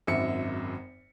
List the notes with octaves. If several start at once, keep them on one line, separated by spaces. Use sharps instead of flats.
G#1 F#2 E5 C#7